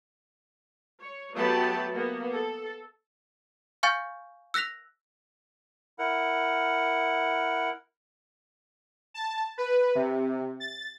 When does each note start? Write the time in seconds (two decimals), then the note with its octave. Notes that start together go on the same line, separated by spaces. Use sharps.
1.00 C#5
1.35 F#3 A3 B3 G4 A5 B5
1.93 A#3 B3
2.32 A4
3.83 F5 G#5 C#6 F6 G6 A6
4.54 E6 F#6 A#6 B6 F7
5.99 E4 A#4 F#5
9.14 A5
9.58 B4
9.95 C3
10.60 A6